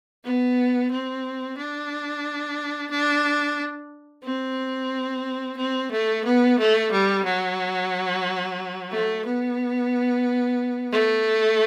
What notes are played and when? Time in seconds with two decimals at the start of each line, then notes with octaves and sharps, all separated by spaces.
0.24 B3
0.91 C4
1.58 D4
2.91 D4
4.24 C4
5.57 C4
5.92 A3
6.25 B3
6.59 A3
6.92 G3
7.25 F#3
8.91 A3
9.25 B3
10.92 A3